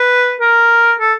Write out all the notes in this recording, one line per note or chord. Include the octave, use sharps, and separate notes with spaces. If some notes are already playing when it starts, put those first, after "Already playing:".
Already playing: B4
A#4
A4